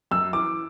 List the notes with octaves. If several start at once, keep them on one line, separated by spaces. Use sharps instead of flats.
F#2 E6
E3 D6